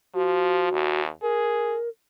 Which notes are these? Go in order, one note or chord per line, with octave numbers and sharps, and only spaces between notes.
F3 F#4
D#2
G#4 A#4